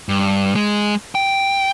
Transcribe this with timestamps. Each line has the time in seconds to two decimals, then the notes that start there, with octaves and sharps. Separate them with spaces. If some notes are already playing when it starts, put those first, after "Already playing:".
0.09 G2
0.56 G#3
1.15 G5